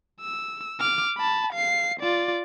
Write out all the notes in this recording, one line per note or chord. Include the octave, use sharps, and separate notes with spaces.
E6
D6 F6
A5 B5
F5 C7
F4 D5